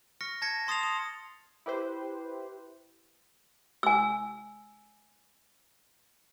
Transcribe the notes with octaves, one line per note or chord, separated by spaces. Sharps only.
C#6 F6 A#6 C#7
A5 G#6 A#6 C#7
A5 C6 D#6 A6 C7 F7
D#6
E4 G4 B4 C5
G#5 E6